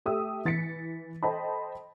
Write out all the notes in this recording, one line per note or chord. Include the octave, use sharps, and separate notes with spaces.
A3 G4 E5 D#6 E6
E3 A6 B6 C#7
A4 C5 D#5 G5 A5 B5